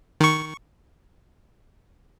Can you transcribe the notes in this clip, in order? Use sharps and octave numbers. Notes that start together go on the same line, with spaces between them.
D#3 C#6